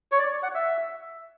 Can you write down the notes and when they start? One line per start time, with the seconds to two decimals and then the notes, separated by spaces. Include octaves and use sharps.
0.12 C#5
0.19 D5
0.43 F#5
0.55 E5